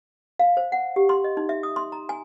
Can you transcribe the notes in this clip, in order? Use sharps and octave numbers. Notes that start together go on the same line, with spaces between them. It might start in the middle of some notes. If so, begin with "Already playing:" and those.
F5
C5
F#5
G4
C6
D#5
D#4
E5
D#6
C6
A#5
G#5